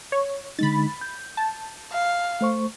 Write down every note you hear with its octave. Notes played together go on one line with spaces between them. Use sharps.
C#5
D3 G#3 D#4 B5 A6
G6
A5
F5
A3 C5 C#6